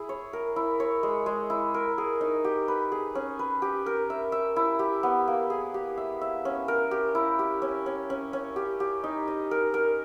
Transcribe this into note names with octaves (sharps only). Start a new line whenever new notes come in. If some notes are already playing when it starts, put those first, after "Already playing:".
Already playing: E4 G#4
C#5
A#4
E4
C#5
G#3
G#3
E4
A#4
G#4
D#4
G4
B4
G#4
C#4
B4
G4
A#4
E5
E5
E4
G4
B3
A#3
G#4
G4
E5
E5
C#4
A#4
G4
E4
G4
C#4
C#4
C#4
C#4
G4
G4
D#4
D#5
A#4
A#4